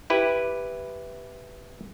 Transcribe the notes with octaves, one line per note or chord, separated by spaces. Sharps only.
E4 G4 B4